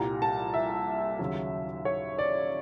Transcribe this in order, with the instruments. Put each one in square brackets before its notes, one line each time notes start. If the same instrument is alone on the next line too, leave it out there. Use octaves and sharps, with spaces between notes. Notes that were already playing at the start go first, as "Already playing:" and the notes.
Already playing: [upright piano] C2 A#2 G3 A#5
A5
E5
D#2 C#3 F#3
C#5
D5